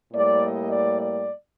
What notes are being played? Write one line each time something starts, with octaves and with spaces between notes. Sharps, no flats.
A2 G3 A#3 D5
D#5
D5
D5